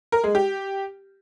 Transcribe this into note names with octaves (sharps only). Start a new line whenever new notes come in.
A#4
G#3
G4